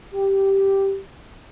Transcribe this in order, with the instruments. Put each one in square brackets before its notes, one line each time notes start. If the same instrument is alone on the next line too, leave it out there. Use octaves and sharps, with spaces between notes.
[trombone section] G4